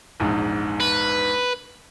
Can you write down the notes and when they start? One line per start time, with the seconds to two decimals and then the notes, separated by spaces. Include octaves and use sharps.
0.20 A#1 E2 G#2
0.80 B4